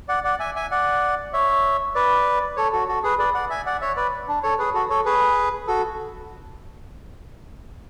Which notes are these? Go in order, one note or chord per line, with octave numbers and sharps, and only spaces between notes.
D5 F#5
D5 F#5
E5 G#5
E5 G#5
D5 F#5
C#5 E5
B4 D5
A4 C#5
F#4 A4
F#4 A4
G#4 B4
B4 D5
D5 F#5
E5 G#5
D5 F#5
C#5 E5
B4 D5
D4
A4 C#5
G#4 B4
F#4 A4
A4 C#5
G#4 B4
F#4 A4